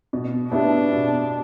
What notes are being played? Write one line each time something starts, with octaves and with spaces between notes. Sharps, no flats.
B2
B3 D4 E4 G4
B2